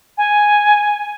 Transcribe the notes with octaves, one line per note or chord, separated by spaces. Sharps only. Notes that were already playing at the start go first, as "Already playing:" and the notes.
G#5